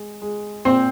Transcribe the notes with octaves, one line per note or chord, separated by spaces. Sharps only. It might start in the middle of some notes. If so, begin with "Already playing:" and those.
Already playing: G#3
G#3
A#2 C4 C5